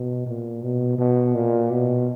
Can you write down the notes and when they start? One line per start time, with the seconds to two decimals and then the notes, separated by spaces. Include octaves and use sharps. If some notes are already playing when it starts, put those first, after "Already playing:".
Already playing: B2
0.26 A#2
0.63 B2
0.98 B2
1.35 A#2
1.71 B2